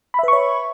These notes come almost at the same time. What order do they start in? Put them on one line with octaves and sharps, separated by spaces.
B5 E5 B4 C#6 C#5